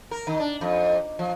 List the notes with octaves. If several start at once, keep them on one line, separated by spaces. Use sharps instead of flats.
A#4
D#3
D4
F2
F3